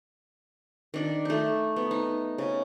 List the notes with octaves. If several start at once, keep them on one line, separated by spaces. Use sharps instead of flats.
D#3 D4
A3 D#4
B3
D#4
C#3